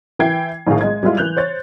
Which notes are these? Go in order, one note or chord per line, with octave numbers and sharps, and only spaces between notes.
E3 E4 G5 G#6 C7
A#1 A2 D#3 G#4 F5
G#3 D#5 G#6
G3 G#3 E4 F4
E3 F#6 G6 F7
C5 C#5 A6